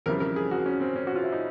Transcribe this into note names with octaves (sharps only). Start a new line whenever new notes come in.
F2 C#3 E3 G3 A#4
A#4
G#4
F#4
C#4
C4
C#4
F#4
F4
E4
D#4